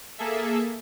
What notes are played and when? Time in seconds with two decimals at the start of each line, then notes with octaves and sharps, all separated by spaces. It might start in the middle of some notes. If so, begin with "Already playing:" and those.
0.18 A#3 G#4 A4 E5